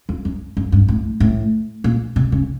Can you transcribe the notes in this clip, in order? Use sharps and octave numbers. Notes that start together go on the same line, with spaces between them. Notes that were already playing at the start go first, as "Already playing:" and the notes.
F2
F#2
F#2
G2
A2
A2
A#2
C3
C#3